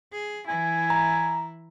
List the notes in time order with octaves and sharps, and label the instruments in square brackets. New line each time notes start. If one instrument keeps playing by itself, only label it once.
[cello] G#4
[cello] E3 E4 [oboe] G#5
[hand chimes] A#5